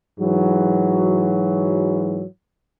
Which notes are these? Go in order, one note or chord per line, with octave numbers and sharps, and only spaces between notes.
G#2 E3 F#3